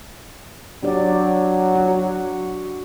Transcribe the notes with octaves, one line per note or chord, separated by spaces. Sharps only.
F#3 D4 G4 D5
F#4